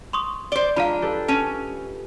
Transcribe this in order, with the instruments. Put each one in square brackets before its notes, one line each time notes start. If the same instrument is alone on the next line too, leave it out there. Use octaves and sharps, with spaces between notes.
[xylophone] C6 C#6 D#6
[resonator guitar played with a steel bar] C5 D5 [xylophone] D7 G7
[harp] G#3 F4 [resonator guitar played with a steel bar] D4 [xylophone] F5 A#5 B5
[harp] G4 A4 B4
[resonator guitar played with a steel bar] C#4 [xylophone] A5 D#7